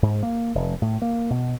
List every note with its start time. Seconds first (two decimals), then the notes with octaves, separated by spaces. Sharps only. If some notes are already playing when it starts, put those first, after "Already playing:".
0.02 G#2
0.23 A#3
0.55 F1
0.82 A2
1.02 A#3
1.30 B2